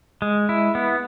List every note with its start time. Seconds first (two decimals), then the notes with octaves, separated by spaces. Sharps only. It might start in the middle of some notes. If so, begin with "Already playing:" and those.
0.22 G#3
0.49 E4
0.75 B3